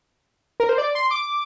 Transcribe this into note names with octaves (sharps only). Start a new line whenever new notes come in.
A#4
C5
D5
C6
D6